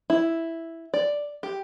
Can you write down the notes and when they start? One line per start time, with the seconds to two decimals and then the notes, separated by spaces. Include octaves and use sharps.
0.10 E4
0.94 D5
1.43 G4